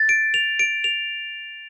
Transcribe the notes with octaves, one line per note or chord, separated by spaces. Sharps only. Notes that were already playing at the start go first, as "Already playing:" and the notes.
Already playing: A6
D7
F7
D7
F7